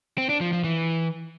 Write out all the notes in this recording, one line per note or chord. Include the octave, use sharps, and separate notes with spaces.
C4
D4
F3
F3
E3